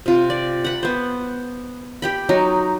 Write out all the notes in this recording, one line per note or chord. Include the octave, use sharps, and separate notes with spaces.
C3 F4
D5
F#5 B5
B3 C5
G4 G5 B5
F#3 D#4